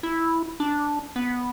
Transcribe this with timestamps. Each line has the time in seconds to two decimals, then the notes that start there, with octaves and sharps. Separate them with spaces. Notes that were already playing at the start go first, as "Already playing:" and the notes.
0.03 E4
0.60 D4
1.16 B3